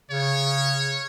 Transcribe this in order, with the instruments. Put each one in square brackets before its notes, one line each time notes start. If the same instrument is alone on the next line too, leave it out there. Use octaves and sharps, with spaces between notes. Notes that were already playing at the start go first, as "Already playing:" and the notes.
[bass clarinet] C#3 [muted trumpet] C#5